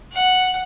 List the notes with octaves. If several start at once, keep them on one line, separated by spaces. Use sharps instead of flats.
F#5